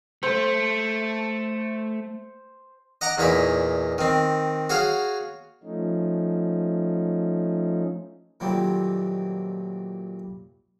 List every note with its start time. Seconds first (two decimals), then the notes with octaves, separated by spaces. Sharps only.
0.23 A3 C5
3.01 D#5 F#5 A#5 D6
3.18 E2 A#2 D#4 C#5 B5
3.98 D#3 C4
4.70 F#4 G#4 C#5 F5
5.63 F3 A3 C#4 D#4
8.40 A#2 D#3 F#3 G3 A3 C4